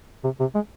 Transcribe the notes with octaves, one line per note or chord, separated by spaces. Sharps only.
C3
C3
G#3